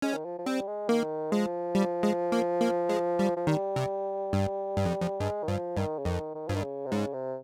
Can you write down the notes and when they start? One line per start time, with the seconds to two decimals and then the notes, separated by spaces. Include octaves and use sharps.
0.02 G#3 C#4
0.14 D#3
0.25 F3
0.38 F3
0.46 G3 C4
0.67 G#3
0.89 D#3 A#3
1.32 F3 G#3
1.75 G3
2.03 G#3
2.32 A#3
2.61 A#3
2.89 G#3
3.19 G3
3.36 F3
3.47 D#3 G3
3.76 C3
4.33 G2
4.77 G2
4.85 F2
5.01 F2
5.20 G2 G#3
5.43 D#3
5.48 G2 F3
5.77 G2 D#3
5.99 C#3
6.05 F2 D#3
6.35 D#3
6.48 G2 F3
6.55 D#3
6.63 C#3
6.86 C3
6.92 G#2 C#3
7.13 C3